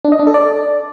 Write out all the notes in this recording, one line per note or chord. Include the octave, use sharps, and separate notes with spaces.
D4
D#5
D4
A4
D5